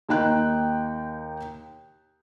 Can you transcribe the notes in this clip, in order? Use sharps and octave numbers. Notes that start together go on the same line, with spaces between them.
D#2 D#4 G5 F#6